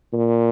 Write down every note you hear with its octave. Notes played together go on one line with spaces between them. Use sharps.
A#2